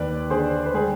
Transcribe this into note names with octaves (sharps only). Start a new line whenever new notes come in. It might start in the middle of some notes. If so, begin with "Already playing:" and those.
Already playing: D#2 B4 D5
D3 G#4 C5
B4
G3 G#4